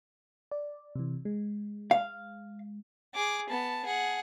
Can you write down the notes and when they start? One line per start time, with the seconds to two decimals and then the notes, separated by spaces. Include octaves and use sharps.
0.51 D5
0.95 C3 E3
1.25 G#3
1.91 F5
3.14 G#4 D6
3.49 B3 A5
3.85 G#4 F#5